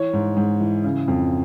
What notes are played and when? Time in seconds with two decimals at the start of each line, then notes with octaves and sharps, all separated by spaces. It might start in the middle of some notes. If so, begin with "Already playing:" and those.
Already playing: E3 C#5
0.13 G#2
0.37 G#2
0.60 E3
0.84 C#3
1.08 F2